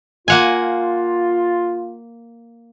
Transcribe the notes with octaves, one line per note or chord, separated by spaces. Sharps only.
A#3 F4 F#5 G#5